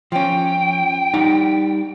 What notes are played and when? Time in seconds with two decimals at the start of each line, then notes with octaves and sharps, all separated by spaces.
0.12 F3 C#4 G5
1.14 G3 D#4 F#5